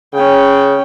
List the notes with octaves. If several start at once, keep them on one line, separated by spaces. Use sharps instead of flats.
C#3 C#4 G5